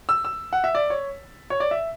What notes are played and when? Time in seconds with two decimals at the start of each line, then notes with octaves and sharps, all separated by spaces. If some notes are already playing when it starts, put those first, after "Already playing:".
0.09 E6
0.25 E6
0.53 F#5
0.64 E5
0.75 D5
0.90 C#5
1.50 C#5
1.60 D5
1.71 E5